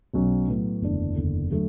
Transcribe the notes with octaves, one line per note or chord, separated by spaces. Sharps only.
B1 B2 F#3 C#4
A2 F#3 B3
F#1 E2 D3 A3 D4
F#1 E2 D3
D3 F#3 A3